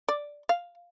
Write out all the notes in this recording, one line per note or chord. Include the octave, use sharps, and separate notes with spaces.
D5
F5